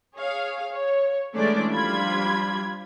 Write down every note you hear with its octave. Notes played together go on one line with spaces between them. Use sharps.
G#4 C#5 F5
C#5
E3 G#3 A3 C#4 D4 D5
F3 G3 D4 F4 B5 G#6